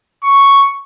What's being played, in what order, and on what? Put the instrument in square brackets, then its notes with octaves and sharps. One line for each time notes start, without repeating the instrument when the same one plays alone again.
[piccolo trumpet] C#6